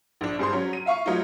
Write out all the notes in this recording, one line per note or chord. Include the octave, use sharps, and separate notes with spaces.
A#1 D4
G2 G#4 C5 C6
F#3 C#4
D#7
E5 F5 C#6
F#3 A3 D#4 F4